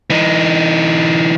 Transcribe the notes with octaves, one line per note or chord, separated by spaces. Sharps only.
E3 D#4